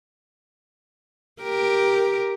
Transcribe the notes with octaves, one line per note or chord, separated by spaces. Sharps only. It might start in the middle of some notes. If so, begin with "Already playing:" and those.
G4 A#4